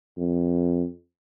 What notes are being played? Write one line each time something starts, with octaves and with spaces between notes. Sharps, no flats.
F2